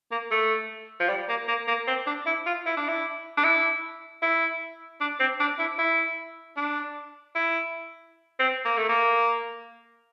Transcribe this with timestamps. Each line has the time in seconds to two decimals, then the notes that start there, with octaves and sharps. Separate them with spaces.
0.11 A#3
0.31 A3
1.00 F3
1.09 G3
1.29 A#3
1.48 A#3
1.68 A#3
1.88 C4
2.07 D4
2.26 E4
2.46 F4
2.66 E4
2.77 D4
2.88 E4
3.37 D4
3.44 E4
4.22 E4
5.00 D4
5.20 C4
5.40 D4
5.59 E4
5.79 E4
6.57 D4
7.35 E4
8.39 C4
8.65 A#3
8.77 A3
8.89 A#3